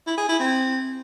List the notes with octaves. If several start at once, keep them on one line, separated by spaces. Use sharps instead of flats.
E4
G#4
E4
C4